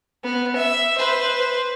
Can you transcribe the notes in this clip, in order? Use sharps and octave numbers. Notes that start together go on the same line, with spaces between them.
B3
E5
B4 C5